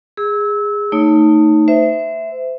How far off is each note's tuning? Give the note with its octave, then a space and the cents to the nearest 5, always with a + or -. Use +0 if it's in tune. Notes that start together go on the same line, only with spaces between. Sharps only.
G#4 -15 E6 -25
A3 +25 D#4 +0 C#5 +0
C5 -30 E5 +0